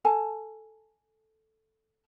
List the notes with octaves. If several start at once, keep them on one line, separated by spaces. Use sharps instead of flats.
A4 G#5 A5